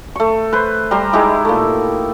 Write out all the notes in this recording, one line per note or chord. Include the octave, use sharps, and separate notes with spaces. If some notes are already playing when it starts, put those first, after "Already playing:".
A3 C#6
B4 C5
G3 A#5 C6
G#3 D#4 E4 G4
A#2 A3